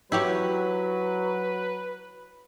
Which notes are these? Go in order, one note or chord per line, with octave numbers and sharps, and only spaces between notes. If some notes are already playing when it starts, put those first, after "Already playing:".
F#3 E4 G4 B4 C#5